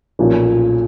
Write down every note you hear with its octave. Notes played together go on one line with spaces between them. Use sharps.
B1 A#2 F3 A#3 C#4